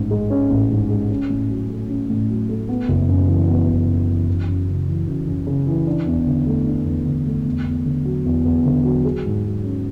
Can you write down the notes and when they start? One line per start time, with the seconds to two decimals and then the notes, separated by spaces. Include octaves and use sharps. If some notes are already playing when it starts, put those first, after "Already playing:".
Already playing: A1 G#2 C#4
0.11 G#3
0.30 C#4
0.50 A1
0.70 G#2
0.90 G#3
1.10 C#4
1.30 A2
1.50 F#3
1.70 A3
1.89 C#4
2.10 A2
2.30 F#3
2.49 A3
2.69 B3
2.88 F#1
3.09 F#2
3.28 E3
3.49 B3
3.68 F#1
3.88 F#2
4.09 E3
4.27 F#2
4.48 F#2
4.68 C#3
4.87 E3
5.07 F#2
5.27 F#2
5.47 C#3
5.67 E3
5.87 D4
6.06 E2
6.27 D3
6.47 A3
6.67 D4
6.86 E2
7.06 D3
7.26 A3
7.46 E2
7.66 E2
7.85 D3
8.05 F#3
8.25 E2
8.45 E2
8.65 D3
8.85 F#3
9.05 G#4
9.25 G#2
9.44 F#3
9.64 C#4